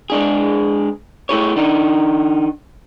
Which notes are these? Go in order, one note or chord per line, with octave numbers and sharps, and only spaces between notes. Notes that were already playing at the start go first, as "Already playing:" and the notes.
G#3 D4 G#4
A3 E4 G#4 C#5
D#3 D4 D#4